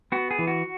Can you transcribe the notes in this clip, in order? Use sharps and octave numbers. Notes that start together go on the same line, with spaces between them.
B3 F#4
G#4
E3
F#4